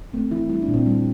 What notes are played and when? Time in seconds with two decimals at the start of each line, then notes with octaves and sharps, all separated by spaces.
0.13 A3 C4
0.31 E3 E4
0.50 G3 E4
0.62 D4
0.68 A#2
0.74 C4
0.86 G3